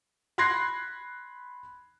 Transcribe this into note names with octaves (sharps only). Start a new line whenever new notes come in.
B5 C6 F#6 G#6 A#6 C7